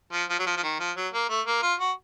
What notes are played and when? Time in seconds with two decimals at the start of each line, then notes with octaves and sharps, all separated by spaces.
0.12 F3
0.29 F3
0.39 F#3
0.47 F3
0.57 F3
0.63 D#3
0.80 F3
0.96 F#3
1.13 A#3
1.29 A3
1.46 A#3
1.63 F4
1.80 F#4